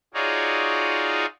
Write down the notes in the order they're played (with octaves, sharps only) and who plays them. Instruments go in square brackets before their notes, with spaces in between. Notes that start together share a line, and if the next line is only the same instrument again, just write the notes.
[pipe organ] D#4 F4 F#4 G#4 C#5 D5